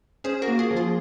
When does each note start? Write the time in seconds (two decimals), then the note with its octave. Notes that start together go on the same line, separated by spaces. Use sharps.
0.24 C#4 G#4 C5
0.42 F#4 A#4
0.48 A#3
0.59 F4 G#4
0.71 F3
0.77 F4 G#4